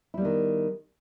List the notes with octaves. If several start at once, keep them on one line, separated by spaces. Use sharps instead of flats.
D#3 G3 B3 E4